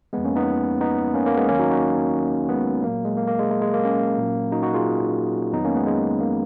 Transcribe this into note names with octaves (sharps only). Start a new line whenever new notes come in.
F2 F3 G#3 B3
A#3 C#4
B3 D#4
B3 D#4
A#3 C#4
A#3 C#4
G#3 B3
D#2 D#3 F#3 A#3 C#4
D#4 F#4
D#4 F#4
G#3 B3
A#2 F#3 A#3
G#3
A#3
A#3
G#3
G#3
G#3
A#3
A#3 C#4
A#2 F#3
D#4 F#4
D#4 F#4
F4 G#4
F2 D#3 F#3 B3 D#4
A#3 C#4
G#3 B3
G#3
A#3